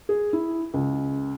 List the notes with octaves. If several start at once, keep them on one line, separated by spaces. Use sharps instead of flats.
G#4
E4
C#2